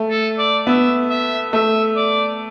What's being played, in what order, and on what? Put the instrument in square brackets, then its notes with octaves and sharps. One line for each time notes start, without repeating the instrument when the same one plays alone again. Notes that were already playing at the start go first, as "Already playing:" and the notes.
Already playing: [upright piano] A3
[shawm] A4
D5
[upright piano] B3 [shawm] E5
[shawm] E5
[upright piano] A3 [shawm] E5
[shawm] D5